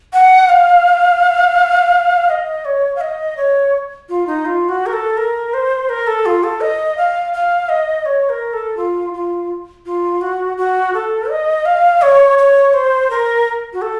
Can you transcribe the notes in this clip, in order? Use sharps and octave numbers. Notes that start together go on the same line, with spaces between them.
F#5
F5
D#5
C#5
F5
D#5
C#5
F4
D#4
F4
F#4
A#4
A4
A#4
C5
A#4
A4
F4
A4
D#5
F5
F5
D#5
C#5
A#4
A4
F4
F4
F4
F#4
F#4
A4
D#5
F5
C#5
C#5
C5
A#4
F#4
A4